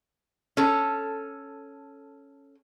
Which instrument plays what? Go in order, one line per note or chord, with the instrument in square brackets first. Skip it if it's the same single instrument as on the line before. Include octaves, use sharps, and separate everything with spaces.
[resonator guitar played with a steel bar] C#4 A4